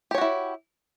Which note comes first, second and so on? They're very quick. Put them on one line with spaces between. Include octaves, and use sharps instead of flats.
G4 C#5 F#4 E4